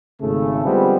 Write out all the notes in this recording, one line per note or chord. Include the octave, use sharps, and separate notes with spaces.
G#1 C#3 A3
D3 F3 G3 G#3 B3 C4